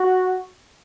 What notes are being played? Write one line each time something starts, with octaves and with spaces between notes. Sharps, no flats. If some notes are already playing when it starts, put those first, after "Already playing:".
Already playing: F#4